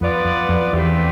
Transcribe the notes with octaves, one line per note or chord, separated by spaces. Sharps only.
F2 B3 F4 B4 D5
F2
F2
E2 A3 C4 G4 B4